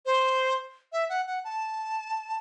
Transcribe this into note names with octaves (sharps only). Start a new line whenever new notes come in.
C5
E5
F#5
F#5
A5